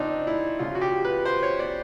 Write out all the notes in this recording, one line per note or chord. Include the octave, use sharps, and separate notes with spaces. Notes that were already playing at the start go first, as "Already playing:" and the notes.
Already playing: C#3 F3 C4 D4 D#4
E4
C#3 F3 F4
F#4
G4
B4
C5
C#5
D5